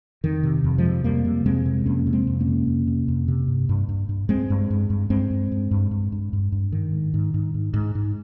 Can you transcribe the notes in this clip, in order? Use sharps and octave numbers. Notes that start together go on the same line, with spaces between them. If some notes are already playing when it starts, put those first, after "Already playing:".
F2 D#3
C3
F2
F3 G#3
C3
F2 G3 A#3
C3
F2 G#3 C4
C3
F2 A#3 C#4
C3
G#3 C4
F2
A#3 C#4
C3
F2
C3
F2
C3
G2
G2
G2
G2
G2 G#3 C4
G2
G2
G2
G2 G#3 C4
G2
G2
G2
G2
G2
G2
G2
G#2 D#3
G#2
G#2
G#2
G#2
G#2
G#2